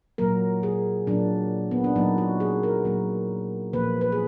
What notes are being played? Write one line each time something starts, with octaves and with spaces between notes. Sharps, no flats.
A#2 F#3 A#3 A#4
G#4
A#2 F#3 A#3 D4
B3
D4
A#2 F#3 A#3 D#4
F#4
G#4
A#4
A#2 F#3 A#3
A#2 F3 A#3 B4
B4
G#4